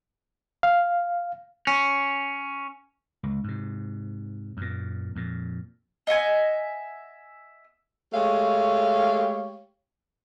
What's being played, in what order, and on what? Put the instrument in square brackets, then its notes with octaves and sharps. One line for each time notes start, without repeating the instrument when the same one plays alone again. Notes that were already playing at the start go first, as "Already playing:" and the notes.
[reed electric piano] F5
[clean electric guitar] C#4
[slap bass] C#2
G#2 C3
F#2 A#2
F2 A#2
[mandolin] D#5 E5 F#5 G#5
[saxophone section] G#3 A3 G4 C#5 F5